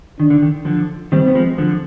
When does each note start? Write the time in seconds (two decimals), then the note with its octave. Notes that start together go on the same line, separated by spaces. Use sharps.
0.19 D#3 D4
0.30 D3
0.42 D#3
0.65 D3 F3
1.12 D#3 G3 C4
1.27 B3
1.35 F3 G#3
1.58 D3 F3